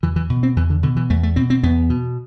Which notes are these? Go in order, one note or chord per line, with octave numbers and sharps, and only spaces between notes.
E2 E3
E3
B2
C4
E2 E3
D3
B2 D3
E3
E2 A3
A3
B2 C4
C4
E2 B3
B2